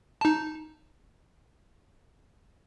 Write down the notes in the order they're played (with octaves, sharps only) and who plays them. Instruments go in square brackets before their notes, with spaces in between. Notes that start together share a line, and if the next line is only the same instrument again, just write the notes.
[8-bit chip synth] D#4 A5